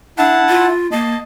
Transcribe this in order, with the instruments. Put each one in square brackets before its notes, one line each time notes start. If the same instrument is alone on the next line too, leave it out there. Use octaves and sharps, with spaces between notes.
[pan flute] D4 [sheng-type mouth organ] E4 F#5 A5
[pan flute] F4
[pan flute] A#3 [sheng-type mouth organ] D#5 A5